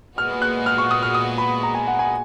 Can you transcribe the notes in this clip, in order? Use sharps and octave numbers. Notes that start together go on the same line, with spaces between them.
A#2 G#3 B3 F#4 F6
F#6
F6
C#6
D#6
F6
D#6
B5
A#5
G#5
F#5
G#5